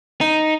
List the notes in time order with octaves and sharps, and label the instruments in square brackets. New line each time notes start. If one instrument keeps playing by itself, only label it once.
[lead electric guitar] D#4